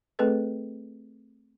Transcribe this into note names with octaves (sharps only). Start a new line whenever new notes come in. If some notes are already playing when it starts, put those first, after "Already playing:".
A3 C4 G#4 A4 B4 D#5